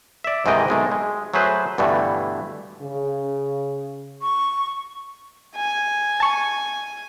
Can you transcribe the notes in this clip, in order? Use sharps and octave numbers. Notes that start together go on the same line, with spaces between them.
D5 E5
G#2 C3 D#3 E3 D#5 G5
B1 G#3 A3
G#3
F#3 A3 G#4 B4 C5
G2 B2 D3 E3 A3
C#3
C#6
G#5
A5 C#6